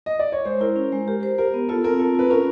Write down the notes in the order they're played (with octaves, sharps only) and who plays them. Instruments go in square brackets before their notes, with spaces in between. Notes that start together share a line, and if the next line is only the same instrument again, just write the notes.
[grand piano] D#5
D5
C#5
[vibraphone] G#3 [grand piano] C5
[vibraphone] E4 [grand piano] A#4
[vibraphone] C#4
G#3
[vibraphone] G4 [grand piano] A#4
[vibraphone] C5
[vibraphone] G4 [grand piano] A#4
[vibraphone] B3
[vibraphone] F4 [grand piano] A4
[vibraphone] C4 [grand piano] A#4
[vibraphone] F4 [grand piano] A4
[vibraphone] F4 [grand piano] B4
[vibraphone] C#4 [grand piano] A#4